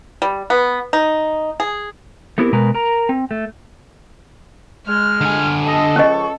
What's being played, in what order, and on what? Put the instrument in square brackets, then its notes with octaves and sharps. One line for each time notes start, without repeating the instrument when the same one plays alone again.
[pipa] G3
B3
D#4
G#4
[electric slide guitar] A3 B3 C4 E4 G4 A#4
B2 G#3 A#4 B4
A#4 A#5
C4
A3
[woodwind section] G#3 [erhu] F6
[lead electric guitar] D3 G#5
[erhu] A4 [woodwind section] D#5
[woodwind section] C#2 F3 C#6 [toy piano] C#4 D#5